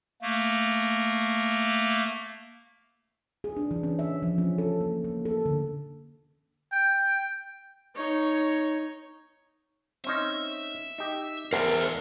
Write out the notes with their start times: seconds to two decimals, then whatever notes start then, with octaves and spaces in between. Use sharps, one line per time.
0.22 A3 A#3
3.44 G#4
3.56 D4
3.71 E3
3.83 C#4
3.99 E5
4.22 F3
4.38 C#4
4.58 A4
4.81 A#3
5.04 A#3
5.25 A4
5.46 D3
6.72 G5
7.95 D#4 C#5
10.04 C4 C#4 D#4 E5
10.98 D#4 G4
11.53 E2 G#2 A#4 C5 E5